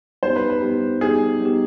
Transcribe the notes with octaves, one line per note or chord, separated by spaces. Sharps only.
G3 B3 D#4 G4 C5
B4
B4
G3 B3 D#4 G4
G3 B3 D#4 G4 G#4
G3 B3 D#4 G4